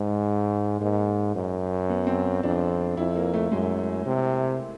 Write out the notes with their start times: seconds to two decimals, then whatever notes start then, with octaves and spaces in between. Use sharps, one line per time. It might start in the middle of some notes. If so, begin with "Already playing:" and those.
Already playing: G#2 G#3
0.81 G#2 A#3
1.35 F#2
1.90 B3
2.07 C4
2.43 F2 D4
2.97 F2 E4
3.16 A#3
3.34 A3
3.51 F#2 G#3
4.06 C3